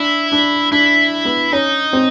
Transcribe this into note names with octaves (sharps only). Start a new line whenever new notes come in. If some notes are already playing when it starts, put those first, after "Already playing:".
Already playing: D4 E4
D4
D4 E4
B3
C#4 D#4
C4